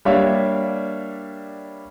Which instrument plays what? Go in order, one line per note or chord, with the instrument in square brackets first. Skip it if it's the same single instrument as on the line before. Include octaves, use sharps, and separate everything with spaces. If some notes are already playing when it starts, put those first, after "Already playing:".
[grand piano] G3 A#3 D4 C#5 E5 F5